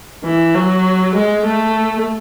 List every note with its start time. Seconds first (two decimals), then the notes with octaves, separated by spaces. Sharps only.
0.24 E3
0.54 F#3
1.15 G#3
1.45 A3